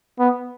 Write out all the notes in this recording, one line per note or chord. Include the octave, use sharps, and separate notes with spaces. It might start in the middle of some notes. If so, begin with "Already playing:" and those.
B3